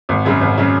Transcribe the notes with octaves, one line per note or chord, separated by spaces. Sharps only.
G#1
F#2 C#3 F#3
G#1
C#3 F#3